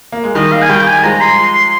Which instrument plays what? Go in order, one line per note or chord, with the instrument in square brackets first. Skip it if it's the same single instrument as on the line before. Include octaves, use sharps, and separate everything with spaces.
[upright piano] A#3
G#3
[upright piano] D#3 G3 [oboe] D#5
[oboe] F5
G#5
[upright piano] D#3 G3 [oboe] G5
[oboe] G#5
[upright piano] F3 G#3 [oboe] A#5
[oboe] C6
C6
C6